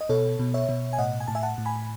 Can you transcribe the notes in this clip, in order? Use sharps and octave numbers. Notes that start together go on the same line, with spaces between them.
D#5
B2 A4 C#5
B2
C#5 E5
B2
G#5
A2 D#5 F#5
G#5
A2 A5
E5 G#5
F#5 A5
A2
G#5 B5